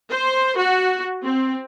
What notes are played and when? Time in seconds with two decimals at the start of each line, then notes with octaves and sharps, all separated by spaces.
0.11 C5
0.58 F#4
1.24 C4